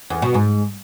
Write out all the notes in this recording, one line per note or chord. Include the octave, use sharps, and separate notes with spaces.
E2
B2
G#2